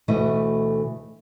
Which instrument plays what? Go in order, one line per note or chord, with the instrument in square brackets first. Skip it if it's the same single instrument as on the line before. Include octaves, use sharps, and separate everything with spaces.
[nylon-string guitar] D2 B2 E3 A3 D#5 E5